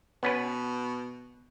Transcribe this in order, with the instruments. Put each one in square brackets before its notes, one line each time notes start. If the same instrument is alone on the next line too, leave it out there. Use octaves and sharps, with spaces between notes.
[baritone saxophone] B2 [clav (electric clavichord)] B3 C#4 B4